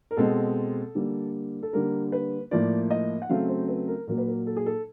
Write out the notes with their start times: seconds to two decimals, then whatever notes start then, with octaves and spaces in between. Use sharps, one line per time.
0.11 A#4
0.17 B2 G#3 C4 A4
0.95 D3 G3 A#3
1.63 A4
1.73 D3 G3 A#3 A#4
2.12 B4
2.51 A2 F3 A#3 D5
2.91 D#5
3.22 F#5
3.29 C#3 F#3 A3 C4 F5
3.49 C5
3.69 B4
3.88 A#4
4.07 A#2 F#3 A#3 A#4
4.18 B4
4.28 A#4
4.47 A4
4.57 G#4
4.66 A4